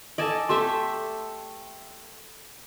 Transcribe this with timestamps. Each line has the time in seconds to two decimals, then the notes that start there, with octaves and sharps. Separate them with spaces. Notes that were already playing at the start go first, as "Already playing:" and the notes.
0.18 A4 D5 D#5 G#5 A5
0.49 A3 G4 A4 E5 C6